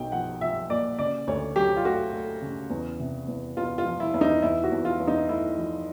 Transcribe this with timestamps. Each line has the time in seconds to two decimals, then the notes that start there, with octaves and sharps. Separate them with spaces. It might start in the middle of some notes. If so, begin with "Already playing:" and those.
Already playing: B1 G5
0.12 F3 F#5
0.41 F3 E5
0.69 A#2 D5
0.99 C#3 D5
1.27 D2 C#5
1.56 F#3 G4
1.77 F4
1.85 A3 F#4
2.13 A3
2.42 C#3
2.70 E2
3.00 C3
3.28 E2
3.57 E2 F4
3.78 F4
3.85 F3
4.00 E4
4.14 E2 E4
4.21 D#4
4.42 E2 E4
4.64 F#4
4.72 E2
4.85 F4
5.00 E2
5.07 D#4
5.29 A3 E4
5.58 F3